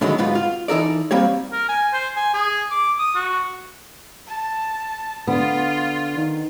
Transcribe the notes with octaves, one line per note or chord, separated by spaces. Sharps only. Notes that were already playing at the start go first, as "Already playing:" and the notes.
A2 D3 D#3 F#3 G#3 B3
G#2 B2 B3 F4
F4
E3 D#4 A4 A#4 D5
G3 A#3 C4 G4 C#5
A#4
G#5
C5
G#5
G#4
D6
D#6
F#4
A5
D3 B3 F4
D#3